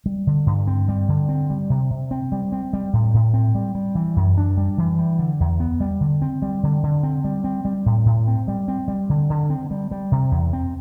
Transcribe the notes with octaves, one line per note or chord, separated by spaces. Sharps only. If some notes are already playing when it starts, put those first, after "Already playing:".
G3
D3
G2
C4
G3
D3
C4
G3
C3
C3
C4
G3
C4
G3
A2
A2
C4
G3
G3
E3
F#2
D4
G3
E3
G3
D3
E2
B3
G3
D3
C4
G3
D3
D3
C4
G3
C4
G3
A2
A2
C4
G3
C4
G3
D3
D3
C4
G3
G3
C3
E2
C4